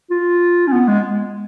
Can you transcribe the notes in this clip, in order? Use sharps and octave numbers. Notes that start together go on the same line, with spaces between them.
F4
C#4
B3
G#3